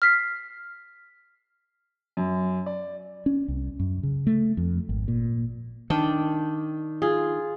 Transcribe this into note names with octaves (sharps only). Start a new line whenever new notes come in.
F6 B6 C7
F#2
D5
C#4
C2
F#2
C#3
A3
F2
G#1
A#2
D#3 D4 G5
F4 G#4